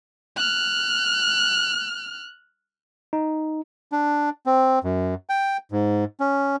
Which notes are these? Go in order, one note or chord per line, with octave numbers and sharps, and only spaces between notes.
F6 F#6
D#4
D4
C4
F#2
G5
G#2
C#4